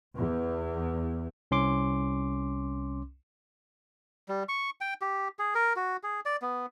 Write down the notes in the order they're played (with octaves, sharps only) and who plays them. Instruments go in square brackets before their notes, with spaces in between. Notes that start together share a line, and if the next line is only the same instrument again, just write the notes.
[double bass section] E2
[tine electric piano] C2 C#4 C6 D6
[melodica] G3
C#6
G5
G4
G#4
A#4
F#4
G#4
D5
B3